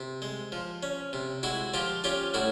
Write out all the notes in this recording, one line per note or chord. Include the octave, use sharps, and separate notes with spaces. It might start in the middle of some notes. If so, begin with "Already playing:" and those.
Already playing: C3
G#3
F3
C#4
C3
G#3 E4 F#4
F3 F4 G4
C#4 F4 G4
A2 E4 F#4